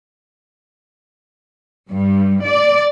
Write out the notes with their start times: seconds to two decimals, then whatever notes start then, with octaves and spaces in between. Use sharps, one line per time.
1.90 G2
2.46 D5